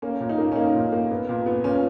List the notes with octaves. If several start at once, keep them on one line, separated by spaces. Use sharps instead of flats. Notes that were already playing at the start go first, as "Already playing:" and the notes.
A#3 C#4
A#2
D#4
A#3
C#4
A#3 D#4
A#2
A#3
B3
A#2
B3
A#2 C#4